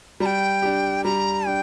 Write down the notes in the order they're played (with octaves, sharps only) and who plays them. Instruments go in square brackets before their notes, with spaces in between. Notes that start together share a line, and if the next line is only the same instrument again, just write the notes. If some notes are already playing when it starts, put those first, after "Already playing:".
[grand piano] G3 [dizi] A#5
[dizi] G5
[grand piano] D4 G4
[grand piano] G3 [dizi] A#5
[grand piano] D4 [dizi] G5